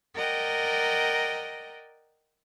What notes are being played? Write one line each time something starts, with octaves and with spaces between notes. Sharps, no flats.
A#4 D5 D#5 F#5 G5